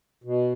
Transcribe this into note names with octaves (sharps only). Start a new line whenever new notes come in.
B2